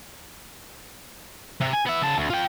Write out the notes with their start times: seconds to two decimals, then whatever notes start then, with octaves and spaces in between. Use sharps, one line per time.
1.61 C3
1.73 G#5
1.86 B3 E5
2.02 C#3 A5
2.17 D2
2.30 F4 G5